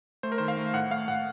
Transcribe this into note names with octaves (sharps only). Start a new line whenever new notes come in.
A3 C5
A#4
D#3 C5
F5
A3
A2 F#5
A3 F5
A2 F#5